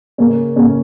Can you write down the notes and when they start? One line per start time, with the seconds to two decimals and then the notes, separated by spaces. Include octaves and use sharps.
0.18 C#3 A#3 C#4
0.56 C#3 A#3 C#4